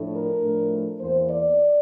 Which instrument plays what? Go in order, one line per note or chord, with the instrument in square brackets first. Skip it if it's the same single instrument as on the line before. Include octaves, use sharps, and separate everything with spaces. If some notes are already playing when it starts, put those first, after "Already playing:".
Already playing: [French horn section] A2 F3 A3 D4
A#4
A2 F3 A3 D4
E2 E3 A#3 C5
D5